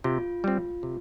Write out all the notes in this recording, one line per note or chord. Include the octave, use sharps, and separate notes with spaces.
C3 F4
G3 C4
C3